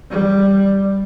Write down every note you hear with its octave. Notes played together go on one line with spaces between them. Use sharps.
G3